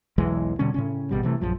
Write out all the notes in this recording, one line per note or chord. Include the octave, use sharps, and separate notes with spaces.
B1 E2 E3 G#3
B2 D3 G3 C#4
A2 C#3 C#4
G#1 B2 G3
C3 E3 A3
A#1 F#2 F3